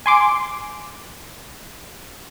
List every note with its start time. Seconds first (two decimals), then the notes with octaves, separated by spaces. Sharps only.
0.06 G#5 C6 D6